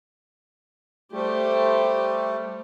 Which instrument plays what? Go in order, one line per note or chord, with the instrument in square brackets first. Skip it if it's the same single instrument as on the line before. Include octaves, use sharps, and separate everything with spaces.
[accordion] G3 A3 [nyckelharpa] G4 C5